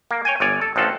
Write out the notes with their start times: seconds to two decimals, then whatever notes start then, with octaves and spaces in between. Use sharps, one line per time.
0.11 A#3
0.25 C#5 G5 G#5
0.40 G1 C#5 D5 G#5
0.62 A4
0.76 A1 F3 C4 F4 F#4 A4